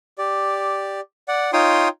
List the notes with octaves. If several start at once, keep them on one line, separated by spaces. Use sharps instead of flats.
G4 D5
D5 F#5
D#4 F4 C#5 G5 C6 D#6